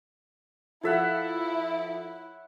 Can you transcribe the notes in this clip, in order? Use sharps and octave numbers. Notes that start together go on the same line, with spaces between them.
F3 E4 A4 C#5 E5 F#5